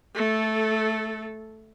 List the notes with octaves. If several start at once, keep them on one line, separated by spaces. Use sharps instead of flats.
A3 A4